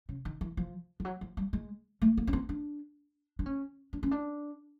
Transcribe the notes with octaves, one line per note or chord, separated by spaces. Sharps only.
C#3
D#3
E3
F3
F3
F#3
F3
G3
G#3
A3
A#3
C#4
C4
D4
D4
C#4
D4
C#4
D4